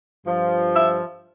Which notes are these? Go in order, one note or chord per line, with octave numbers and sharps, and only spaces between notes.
G2 F3
E5